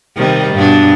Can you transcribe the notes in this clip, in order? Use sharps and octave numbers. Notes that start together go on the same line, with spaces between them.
C3 D#3 G3
G2 B2 D4